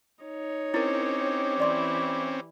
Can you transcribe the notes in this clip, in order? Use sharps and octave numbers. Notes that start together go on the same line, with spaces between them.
D#4 C#5
C4 C#4 E4 G4 A#4
E3 E4 D5 C6 D6